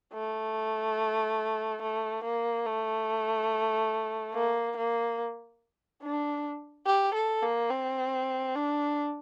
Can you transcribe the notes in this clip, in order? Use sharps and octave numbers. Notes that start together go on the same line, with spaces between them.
A3
A3
A#3
A3
A#3
A#3
D4
G4
A4
A#3
C4
D4